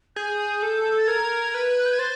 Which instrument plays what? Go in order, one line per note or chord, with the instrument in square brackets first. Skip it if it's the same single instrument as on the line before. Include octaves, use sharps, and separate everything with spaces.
[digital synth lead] G#4 [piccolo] G6
[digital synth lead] A4
[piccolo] A6
[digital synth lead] A#4 [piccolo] G#6
[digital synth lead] B4
[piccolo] F#6
G6
G#6
[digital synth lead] C5 [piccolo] A6